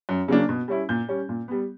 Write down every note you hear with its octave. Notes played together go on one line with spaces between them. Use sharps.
F#2
C#3 F#3 A#3 D4
B2
G3 C#4 E4
A#2 G6
G3 C#4
A#2
G3 B3